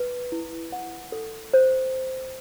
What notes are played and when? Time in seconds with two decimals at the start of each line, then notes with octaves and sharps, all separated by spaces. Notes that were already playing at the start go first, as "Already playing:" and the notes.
Already playing: B4
0.32 E4
0.72 F#5
1.12 A4
1.54 C5